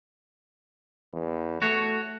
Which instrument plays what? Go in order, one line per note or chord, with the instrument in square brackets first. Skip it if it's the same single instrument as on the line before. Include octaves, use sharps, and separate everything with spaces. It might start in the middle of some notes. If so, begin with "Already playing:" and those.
[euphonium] E2
[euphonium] A3 [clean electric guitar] F#4 C#5